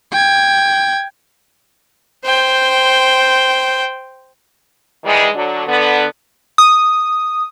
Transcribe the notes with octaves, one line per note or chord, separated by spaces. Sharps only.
G5 G#6
C5 G5
D#3 E3 G3 G#3
D3 F#3
D3 B3
D#6